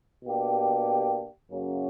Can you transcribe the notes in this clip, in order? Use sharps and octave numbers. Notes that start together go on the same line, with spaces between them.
B2 A#3 D4 G4
F#2 C#3 F#3 A#3 C#4